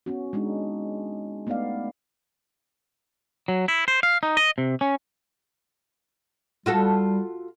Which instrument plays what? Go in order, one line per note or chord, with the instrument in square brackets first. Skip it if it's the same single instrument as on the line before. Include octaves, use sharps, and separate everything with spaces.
[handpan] B3 C#4 F#4
G#3 D4 D#4
A3 B3 D#4 D5 F5
[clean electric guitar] F#3
E4
C5
F5
D#4
D#5
C3
C#4
[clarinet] G3 [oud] F4 F#4 A4